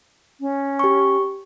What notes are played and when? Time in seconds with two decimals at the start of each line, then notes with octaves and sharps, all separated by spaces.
0.41 C#4
0.79 G4 C#6